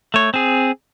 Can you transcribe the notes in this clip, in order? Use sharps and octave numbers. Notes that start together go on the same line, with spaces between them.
A3 C#5
C4 G#4